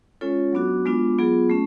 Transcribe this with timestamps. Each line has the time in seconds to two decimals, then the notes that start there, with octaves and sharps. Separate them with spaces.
0.21 G#3 C#4 F4 A4 C#5
0.53 F#3 B3 D4 F#4
0.86 G#3 B3 D4 F4
1.18 F#3 B3 F4 G#4
1.50 A3 C#4